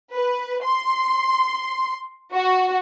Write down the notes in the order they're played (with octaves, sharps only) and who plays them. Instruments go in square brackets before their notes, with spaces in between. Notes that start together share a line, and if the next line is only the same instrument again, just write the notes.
[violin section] B4
C6
F#4